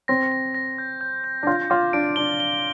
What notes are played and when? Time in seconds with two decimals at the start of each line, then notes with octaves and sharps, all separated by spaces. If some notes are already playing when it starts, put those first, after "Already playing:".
0.08 C4 A#6
0.32 A#6
0.55 A#6
0.78 G6
1.01 G6
1.24 G6
1.43 D4
1.47 F4 G6
1.70 F4 D6
1.93 D4 D7
2.16 D4 G7
2.40 G7